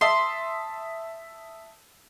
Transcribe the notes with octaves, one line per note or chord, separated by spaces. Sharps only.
E5 A5 C6 D#6